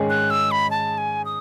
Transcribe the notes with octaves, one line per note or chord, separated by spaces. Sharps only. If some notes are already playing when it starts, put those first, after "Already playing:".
Already playing: G#2 D#3 G#3 C#4 G#4
F#6
E6
B5
A5
G#5
D#6